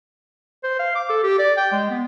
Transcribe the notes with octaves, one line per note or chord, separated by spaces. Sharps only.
C5
F5
D6
A4
G4
D5
G5
G#3
B3